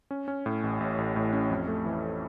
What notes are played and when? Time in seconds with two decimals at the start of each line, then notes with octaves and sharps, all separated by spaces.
0.11 C#4
0.28 C#4
0.46 A2
0.63 A1
0.80 A1
0.98 A1
1.16 A2
1.33 C#4
1.50 F2
1.68 A3
1.86 E3